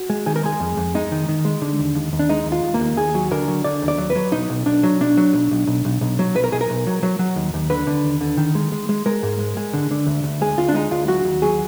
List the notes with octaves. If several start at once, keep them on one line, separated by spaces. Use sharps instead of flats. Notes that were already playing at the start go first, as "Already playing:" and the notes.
Already playing: F#4
G#3
D#3 G#4
A#4
G#3 G#4
F2
F2
G#3 D#4
D#3
D#3
G#3
D3
D#2
D#2
D#2
D4
G#3 D#4
D#2
F4
D#2
A#3
D#2
D#2 G#4
F#3
D3 A#4
F#3
D3 D5
D#2
D5
F#3
B4
F#3
B1 D#4
B1
B1 D4
F#3
B1 D4
F#3
B1
B1
B1
B1
B1
F#3
B1 B4
A#4
B1 G#4
A#4
B1
F#3
F#3
F#3
D#2
D#2
D3 B4
D3
D#2
D3
D#3
G#3
G#3
G#3
G#3 A#4
G#2
G#3
G#3
D3
D3
D2
D2
G#3 G#4
D2 F4
D4
G#3 D#4
D2 F4
F#3 F#4
D#2
F#3 G#4